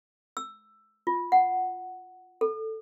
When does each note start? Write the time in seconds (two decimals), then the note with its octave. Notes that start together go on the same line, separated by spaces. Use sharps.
0.37 E6
1.07 F4
1.32 F#5
2.41 A4